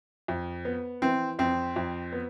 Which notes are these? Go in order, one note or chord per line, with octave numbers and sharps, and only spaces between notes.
F2
B3
E3 C4
F2 C4
F2
B3